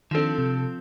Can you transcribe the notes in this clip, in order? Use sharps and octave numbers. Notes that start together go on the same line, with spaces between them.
D#3 F3 C4 D4 A4 E7
C3